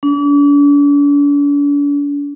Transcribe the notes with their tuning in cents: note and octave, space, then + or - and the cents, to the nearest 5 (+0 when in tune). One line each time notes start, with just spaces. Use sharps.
D4 -45